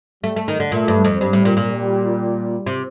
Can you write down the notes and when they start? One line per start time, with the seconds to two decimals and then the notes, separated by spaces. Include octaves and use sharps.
0.24 G3 A3
0.36 A3
0.48 D#3
0.60 D3
0.72 A#2 A3
0.88 G2
1.05 F2
1.20 G2 G3
1.33 A2
1.45 A#2
1.57 A#2
1.70 G3
2.67 C3